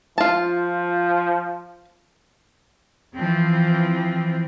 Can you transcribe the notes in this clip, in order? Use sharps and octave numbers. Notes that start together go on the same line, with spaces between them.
F3 F4 A5
E3 F3 C4